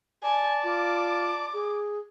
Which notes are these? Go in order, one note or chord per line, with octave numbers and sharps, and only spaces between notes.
D5 G#5 A5
F4 D6
G#4